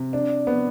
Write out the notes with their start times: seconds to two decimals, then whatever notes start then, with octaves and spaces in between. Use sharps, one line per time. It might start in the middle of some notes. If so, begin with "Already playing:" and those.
Already playing: C3
0.13 D4
0.47 B3